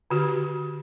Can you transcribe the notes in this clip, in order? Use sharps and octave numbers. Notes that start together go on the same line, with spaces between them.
D3 F#4 G4